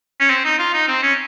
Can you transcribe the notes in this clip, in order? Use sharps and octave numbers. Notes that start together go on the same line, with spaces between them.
C#4
C4
D#4
F4
D#4
C4
C#4